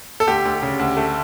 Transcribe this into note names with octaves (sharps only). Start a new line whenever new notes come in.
A4
D2 G4
D2
C#3
D2
A3